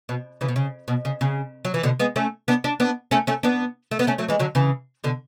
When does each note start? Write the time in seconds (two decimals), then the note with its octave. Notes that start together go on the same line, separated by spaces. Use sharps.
0.09 B2
0.41 C#3 E3
0.48 B2
0.56 C#3
0.88 B2
1.05 C#3
1.21 C#3
1.65 F#3
1.74 E3
1.83 B2 D3
1.99 G#3 B3
2.16 A3 C#4
2.48 B3 D4
2.64 D4
2.80 B3 D4
3.11 A3 C#4
3.27 A3 C#4
3.43 B3 D4
3.91 A3
3.99 B3
4.07 A3 C#4
4.18 F#3 A3
4.28 E3 G#3
4.39 D3 F#3
4.55 C#3 E3
5.04 B2 D3